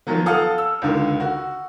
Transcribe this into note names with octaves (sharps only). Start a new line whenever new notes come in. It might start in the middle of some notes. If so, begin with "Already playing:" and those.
D#3 F3 F#3 B3
A4 F5 F#5 A5 D#6 F6
E6
C#2 D3 D#3
F#4